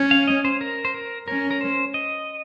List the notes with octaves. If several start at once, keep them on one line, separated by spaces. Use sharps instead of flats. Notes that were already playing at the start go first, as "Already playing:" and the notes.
Already playing: C#4
F5
D#5
C5
A#4
C5
A#4
C#4 A#4
A#4
C5
D#5